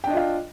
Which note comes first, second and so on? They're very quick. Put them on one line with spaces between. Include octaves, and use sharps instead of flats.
G5 D4 D#5 F4 F5